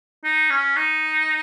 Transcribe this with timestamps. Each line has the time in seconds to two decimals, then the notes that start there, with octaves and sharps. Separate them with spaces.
0.24 D#4
0.50 C#4
0.76 D#4